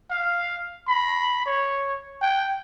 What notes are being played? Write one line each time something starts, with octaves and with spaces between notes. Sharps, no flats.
F5
B5
C#5
G5